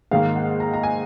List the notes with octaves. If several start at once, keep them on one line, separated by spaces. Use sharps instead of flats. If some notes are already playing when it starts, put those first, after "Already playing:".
G#2 D#3 A#3 F5
F#5
A#5
A#5
G#5